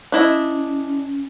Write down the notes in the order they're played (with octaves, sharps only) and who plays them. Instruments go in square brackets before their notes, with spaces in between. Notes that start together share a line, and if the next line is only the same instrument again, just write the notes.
[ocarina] C#4 [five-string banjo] D4 E4 D#5